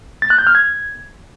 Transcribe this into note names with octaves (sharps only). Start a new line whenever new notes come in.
A6
F#6
G6
F6
G#6